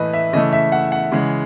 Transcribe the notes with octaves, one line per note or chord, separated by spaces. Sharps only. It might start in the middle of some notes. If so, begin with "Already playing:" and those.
Already playing: A2 E3 A3 B4 D#5
E5
C#3 E3 A3 D#5
E5
F#5
F#5
C#3 E3 G#3